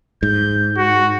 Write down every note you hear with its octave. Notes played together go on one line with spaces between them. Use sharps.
G#2 G6
F#4